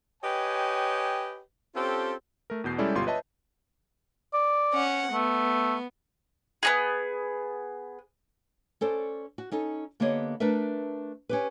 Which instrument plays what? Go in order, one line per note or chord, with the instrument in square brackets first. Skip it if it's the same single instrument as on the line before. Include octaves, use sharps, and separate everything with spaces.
[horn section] G4 B4 C#5 D#5 G5 G#5
C4 C#4 F4 G4 A4
[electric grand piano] A3 A#4
E2 B2 G6 C7
G3 G#3 C#4 E4 A4 D5
G1 B2 F4 G4 C6
B4 C#5 D#5 E5 A5
[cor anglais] D5
[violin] C#4 F#5
[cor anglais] A3 [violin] B3
[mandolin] B3 D#4 G#4
[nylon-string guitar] C#4 A4 C5 D5
F#4
C#4 D#4 A4
D3 A#3 B3 G4 C#5 D#5
A3 D4 A#4 B4 E5
C#4 G4 B4